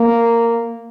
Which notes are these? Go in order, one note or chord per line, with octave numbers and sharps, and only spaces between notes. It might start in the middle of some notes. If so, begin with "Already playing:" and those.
Already playing: A#3